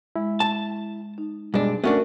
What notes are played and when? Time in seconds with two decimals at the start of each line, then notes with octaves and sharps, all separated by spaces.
0.16 G#3 E4
0.40 A5
1.18 D#4
1.54 G2 B2 G#3 D4
1.84 A3 B3 C#4 D4 F#4 A#4 A5 C#6